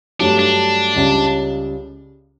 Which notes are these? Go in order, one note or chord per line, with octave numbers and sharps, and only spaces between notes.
G2 F#3 A3 D4
D4
C#2 C#3 G3